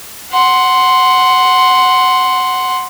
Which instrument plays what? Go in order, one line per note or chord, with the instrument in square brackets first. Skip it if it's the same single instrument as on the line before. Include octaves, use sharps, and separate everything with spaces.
[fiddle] F#5 C6